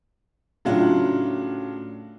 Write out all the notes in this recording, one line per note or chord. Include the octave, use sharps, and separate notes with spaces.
A2 C#3 F#3 D4 F4